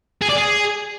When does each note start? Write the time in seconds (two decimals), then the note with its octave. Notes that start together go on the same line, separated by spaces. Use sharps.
0.22 G#4
0.29 D5
0.36 G#4